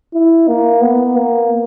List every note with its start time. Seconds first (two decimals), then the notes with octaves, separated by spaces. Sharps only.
0.14 E4
0.48 A#3
0.82 B3
1.16 A#3